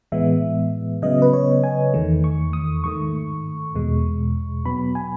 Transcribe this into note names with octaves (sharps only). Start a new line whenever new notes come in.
A2 E3 G#3 B3 E5
C#3 F#3 B3 D#5
B4
C#5
G#5
E2 D#3 A3
C#6
D#6
G#2 D#3 A3 C#6
E2 B2 G#3
B2 F#3 B3 B5
G#5